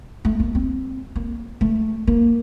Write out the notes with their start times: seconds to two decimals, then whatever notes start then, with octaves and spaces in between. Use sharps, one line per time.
0.25 A3
0.40 A#3
0.55 C4
1.16 A#3
1.61 A3
2.07 A#3